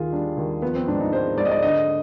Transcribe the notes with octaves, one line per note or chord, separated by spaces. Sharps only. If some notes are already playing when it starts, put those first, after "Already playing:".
Already playing: D#2 D#3 F4 G#4
G3 D4
D#2
F3 B3
C4
G#2 D4
D#4
G#3 C5
G#2 D5
D#5
D5
D3 D#5